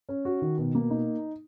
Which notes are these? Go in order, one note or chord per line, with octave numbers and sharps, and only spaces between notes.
C#4
F#4
D#3
B2
A#3
D#4